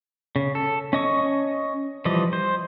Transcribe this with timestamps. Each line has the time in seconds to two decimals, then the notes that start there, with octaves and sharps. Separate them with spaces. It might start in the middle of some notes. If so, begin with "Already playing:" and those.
0.36 C#3
0.55 A4
0.93 C#4 D#5 C#6
2.05 E3 F3 G3 D#5
2.33 C5